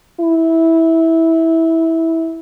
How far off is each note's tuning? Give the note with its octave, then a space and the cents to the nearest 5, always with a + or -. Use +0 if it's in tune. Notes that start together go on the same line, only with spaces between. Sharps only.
E4 -15